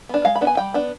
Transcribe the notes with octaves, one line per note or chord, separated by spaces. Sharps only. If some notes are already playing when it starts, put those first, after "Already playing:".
B3 D4
G#3 F5
B5
B3 D4
G#5
G3 G5
B3 D4